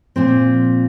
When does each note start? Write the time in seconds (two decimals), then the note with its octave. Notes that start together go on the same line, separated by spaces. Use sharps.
0.16 A#2 F3 C4